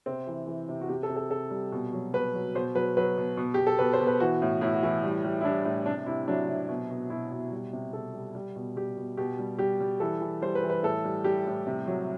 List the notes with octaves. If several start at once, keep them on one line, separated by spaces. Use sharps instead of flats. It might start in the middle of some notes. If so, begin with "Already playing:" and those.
C3 C4
E3
E3
C3
F#4
C3 G4
A4
C3
A4
C3 A4
G3
B2
F#3
B2 B4
F#3
B2 C5
F#3 B4
F#3 B4
B2
B2
B2 G4
A4
B2 B4
C5
B2
B4
E3 F#4
A2
A2 E4
F#4
E3 E4
G3
G3
E4
G3 D4
A2
C3 D4
C3 E4
F#3 D4
C3
B2
B2
B2 E4
B2
G3
C3
C3 A4
G3
G3
B2
G3 G4
B2
B2 G4
G3
G3 G4
G3
E3 A4
E3
G3 C5
B4
E3
B4
A2 A4
G3
G3 G4
A2
C3
F#3